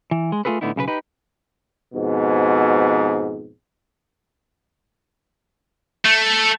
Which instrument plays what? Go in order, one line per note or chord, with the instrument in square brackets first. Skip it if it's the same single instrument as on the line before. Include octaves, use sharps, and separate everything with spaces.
[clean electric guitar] E3
G#3
A3 D#4 F4 G#4 A4 B4
A2 D3 B3 D#4 E4
B1 C#3 E4 B4
D#4 G4 B4
[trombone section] F2 G#2 B2
[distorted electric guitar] A3